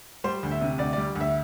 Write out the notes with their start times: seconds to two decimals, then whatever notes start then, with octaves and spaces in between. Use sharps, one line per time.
0.24 G3 C5
0.43 D2
0.51 E5
0.61 C3
0.78 D2 D5
0.93 G3 D5
1.16 D2 E5